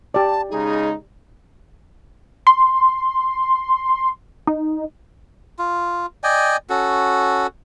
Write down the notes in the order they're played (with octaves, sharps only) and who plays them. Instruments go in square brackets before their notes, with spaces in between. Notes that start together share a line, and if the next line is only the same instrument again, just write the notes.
[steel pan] G4 D5 [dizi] A5
[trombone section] C#3 G#3 D#4 [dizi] G#4
[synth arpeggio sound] C6
D#4
[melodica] F4
D5 D#5 G5 G#5
C#4 F#4 A4